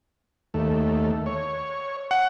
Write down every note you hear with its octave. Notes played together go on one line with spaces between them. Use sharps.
D#2 A3
C#5
F#5